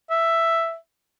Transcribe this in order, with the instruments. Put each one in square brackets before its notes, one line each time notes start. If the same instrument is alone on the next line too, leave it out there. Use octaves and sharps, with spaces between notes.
[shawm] E5